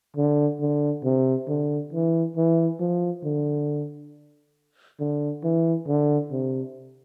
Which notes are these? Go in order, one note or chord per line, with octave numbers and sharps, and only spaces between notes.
D3
D3
C3
D3
E3
E3
F3
D3
D3
E3
D3
C3